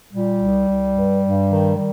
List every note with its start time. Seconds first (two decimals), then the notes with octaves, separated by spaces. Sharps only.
0.13 A#2 G3
0.40 C2
0.68 C2
0.94 G2
1.23 G2
1.50 D#3
1.76 D#3 G3